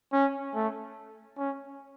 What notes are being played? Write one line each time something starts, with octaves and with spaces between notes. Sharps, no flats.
C#4
A3
C#4